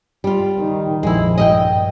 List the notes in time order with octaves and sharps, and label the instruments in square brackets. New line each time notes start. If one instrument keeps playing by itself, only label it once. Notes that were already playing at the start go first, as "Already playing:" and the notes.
[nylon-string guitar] G3 F4
[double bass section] D#3
[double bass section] A#1 F2 [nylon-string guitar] G#3 E4
[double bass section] G2 [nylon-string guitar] D#5 E5 G5